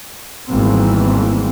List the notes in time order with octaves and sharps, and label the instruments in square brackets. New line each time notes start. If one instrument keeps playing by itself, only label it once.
[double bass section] G#1 B2 E3 G3 A#3 C4